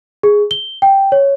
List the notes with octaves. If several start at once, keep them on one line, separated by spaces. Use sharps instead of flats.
G#4
G7
G5
C#5